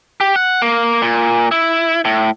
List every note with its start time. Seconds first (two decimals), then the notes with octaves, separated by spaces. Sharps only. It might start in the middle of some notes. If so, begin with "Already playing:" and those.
0.21 G4
0.36 F#5
0.62 A#3
1.02 A#2
1.51 E4
2.05 A2